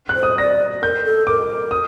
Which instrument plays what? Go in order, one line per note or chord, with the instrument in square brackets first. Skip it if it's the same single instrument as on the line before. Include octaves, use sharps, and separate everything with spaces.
[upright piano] F#6
[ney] C5
[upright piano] D#6
[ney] D5 [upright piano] A#6
[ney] A#4 [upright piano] G6
[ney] A4
[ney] A#4 [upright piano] D6
[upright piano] D#6